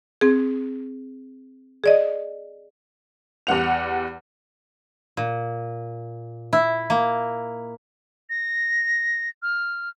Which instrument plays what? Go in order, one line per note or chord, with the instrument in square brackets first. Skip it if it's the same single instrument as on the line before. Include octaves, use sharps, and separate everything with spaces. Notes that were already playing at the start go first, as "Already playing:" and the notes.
[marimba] C4 G#4
G#4 D5 D#5
[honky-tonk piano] E2 G3 F#5 F7
[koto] A#2
E4
A#3
[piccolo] A#6
F6